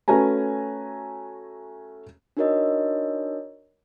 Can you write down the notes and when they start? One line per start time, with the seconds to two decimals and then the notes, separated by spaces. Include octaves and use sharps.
0.08 A3 C#4 F#4 B4 G#5 A#5
2.37 D4 D#4 F#4 A#4 C#5 D#5